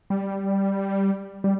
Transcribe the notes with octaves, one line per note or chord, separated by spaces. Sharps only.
G3
G3